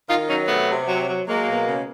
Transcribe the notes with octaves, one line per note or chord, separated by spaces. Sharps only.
D#3 D#4 F4
F#3 C#4 D#4
C3 A3 B3
C3
F#3
F#3
F#3 G#3 A#3
B2
C#3